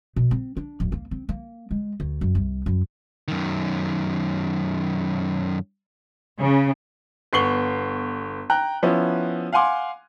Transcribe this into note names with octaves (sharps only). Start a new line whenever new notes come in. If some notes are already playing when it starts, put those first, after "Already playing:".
B2
C4
D4
D1
A#3
C4
A#3
G#3
D2
F#2
C2
F#2
F#2 D#3
C#3
G1 B3 C#6 C7 F#7 G7
G5 A#5 F#6
F3 B3 C#4 E4
F5 F#5 G#5 C6 D6